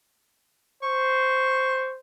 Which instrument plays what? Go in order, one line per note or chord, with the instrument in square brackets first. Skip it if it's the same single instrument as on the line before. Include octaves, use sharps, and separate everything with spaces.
[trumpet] C5 [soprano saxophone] C#6